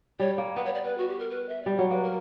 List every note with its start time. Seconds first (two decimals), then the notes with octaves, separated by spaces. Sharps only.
0.20 G3 C#5
0.38 A#3
0.56 B3 B4
0.65 C#5
0.74 D5
0.84 B4
0.98 F#4
1.08 G4
1.19 A#4
1.30 B4
1.49 E5
1.63 G3 D5
1.76 F#3 C#5
1.90 A#3 B4
2.03 A#4